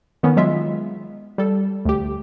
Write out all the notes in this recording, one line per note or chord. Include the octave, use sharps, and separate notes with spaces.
D#3 B3 C#4
F#3 G#3 F4 E5
G3 A4
D2 G4